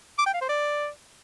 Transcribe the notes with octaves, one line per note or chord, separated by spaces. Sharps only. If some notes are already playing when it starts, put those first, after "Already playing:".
D6
G5
F5
C5
D5